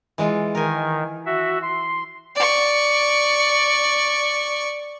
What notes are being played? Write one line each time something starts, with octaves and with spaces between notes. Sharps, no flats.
E3 G#3 F4
D#3 A#4 G#5
F#4 E5
C6
D5 C#6